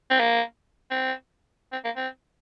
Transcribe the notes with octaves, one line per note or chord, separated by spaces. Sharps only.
C4
A#3
C4
C4
A#3
C4